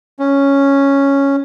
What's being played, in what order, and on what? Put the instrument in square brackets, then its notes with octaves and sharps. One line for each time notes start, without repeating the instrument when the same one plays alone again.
[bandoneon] C#4